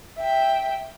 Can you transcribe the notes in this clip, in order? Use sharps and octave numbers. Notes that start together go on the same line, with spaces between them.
E5 G5